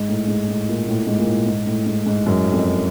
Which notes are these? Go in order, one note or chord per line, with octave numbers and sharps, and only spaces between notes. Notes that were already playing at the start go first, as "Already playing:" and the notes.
Already playing: G#2
A2
G#2
A2
A#2
A2
G#2
A#2
A2
G#2
A2
G#2
G#2
F#2
F2